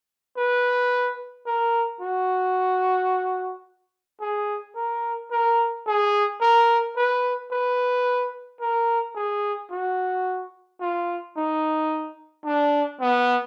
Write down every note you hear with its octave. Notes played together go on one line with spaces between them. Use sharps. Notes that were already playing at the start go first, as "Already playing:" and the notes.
B4
A#4
F#4
G#4
A#4
A#4
G#4
A#4
B4
B4
A#4
G#4
F#4
F4
D#4
D4
B3